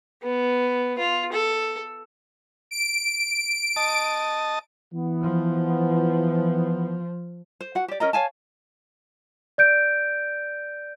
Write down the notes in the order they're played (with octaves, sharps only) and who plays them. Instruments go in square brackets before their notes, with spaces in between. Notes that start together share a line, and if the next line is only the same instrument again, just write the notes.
[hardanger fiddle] B3
F4
A4
[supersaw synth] D7
[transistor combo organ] D#5 A5
[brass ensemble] E3 B3
[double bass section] F3
[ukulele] C5
F#4 F#5
G4 D5
C#4 A#4 D#5 A#5
C#5 F5 G#5 A5
[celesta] D5 G6 D7